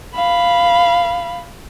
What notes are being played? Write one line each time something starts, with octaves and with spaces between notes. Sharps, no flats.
F5 B5